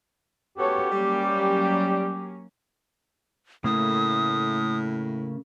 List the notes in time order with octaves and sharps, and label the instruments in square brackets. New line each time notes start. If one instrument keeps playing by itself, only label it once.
[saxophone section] B3 C#4 F#4 [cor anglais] G4 [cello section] A4 C#5
[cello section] F#3 A#3 C#4 [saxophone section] G3
[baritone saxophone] A2 [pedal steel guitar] C#3 A3 A#3 [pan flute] D#6